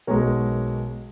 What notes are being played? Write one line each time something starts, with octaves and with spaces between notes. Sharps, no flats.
B1 B2 G#3 A#4 C#5